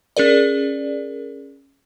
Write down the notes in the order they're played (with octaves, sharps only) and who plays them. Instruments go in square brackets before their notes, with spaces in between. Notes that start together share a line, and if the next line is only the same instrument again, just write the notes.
[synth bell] C#4 G#4 A#4 D5